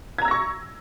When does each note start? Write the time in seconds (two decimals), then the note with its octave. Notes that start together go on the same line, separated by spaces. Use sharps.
0.18 G#6
0.22 A#5
0.25 E6
0.28 A#6
0.31 C#6